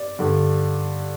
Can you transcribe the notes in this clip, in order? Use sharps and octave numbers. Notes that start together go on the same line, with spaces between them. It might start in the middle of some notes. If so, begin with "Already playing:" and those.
Already playing: D5
G2 D3